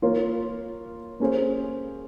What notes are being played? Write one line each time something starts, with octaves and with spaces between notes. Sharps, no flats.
A#3 F4 A#4 C#5
A#3 C#4 G#4 C5